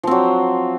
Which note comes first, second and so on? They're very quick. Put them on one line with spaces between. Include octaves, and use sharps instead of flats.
F3 C4 F#3